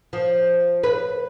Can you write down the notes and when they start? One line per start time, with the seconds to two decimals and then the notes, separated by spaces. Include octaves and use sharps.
0.13 F3
0.83 B4